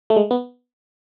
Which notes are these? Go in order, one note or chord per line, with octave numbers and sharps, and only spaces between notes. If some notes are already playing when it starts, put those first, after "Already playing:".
A3
G#3
B3